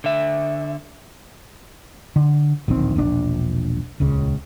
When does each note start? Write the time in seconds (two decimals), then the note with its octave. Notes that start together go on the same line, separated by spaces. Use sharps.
0.04 D3 E5
2.16 D3
2.68 D1 A#1 D#3 C4
2.96 E1 A#1 D4
4.00 D#1 C#2 C#3